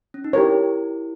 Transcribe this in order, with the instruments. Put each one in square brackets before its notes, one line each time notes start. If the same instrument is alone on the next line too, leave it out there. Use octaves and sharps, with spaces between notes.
[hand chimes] C#4
D#4
[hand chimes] E4 [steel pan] G4 A#4 C#5